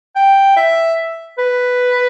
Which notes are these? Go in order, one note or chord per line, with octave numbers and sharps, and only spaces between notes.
G5
E5
B4